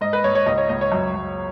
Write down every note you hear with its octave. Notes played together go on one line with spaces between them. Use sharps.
G#2 D#5
B4
G#2 C#5
C#5
C#2 D#5
C#5
C#2 D#5
C#5
F#2
F#2